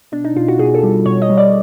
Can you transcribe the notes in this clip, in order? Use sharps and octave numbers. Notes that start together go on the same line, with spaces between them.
B2 D4
D#4
B2 F4
F#4
B2 G#4
A4
G3
B2 C#5
D#5
G3
D5